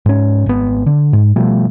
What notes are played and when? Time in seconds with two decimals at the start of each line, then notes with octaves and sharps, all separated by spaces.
0.06 G#2 C#4
0.46 G#1 B3
0.86 D3
1.13 G#2
1.36 B2 F3 G3 A3